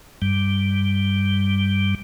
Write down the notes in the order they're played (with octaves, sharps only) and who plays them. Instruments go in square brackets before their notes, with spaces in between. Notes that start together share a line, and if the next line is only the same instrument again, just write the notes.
[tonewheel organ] G2 G3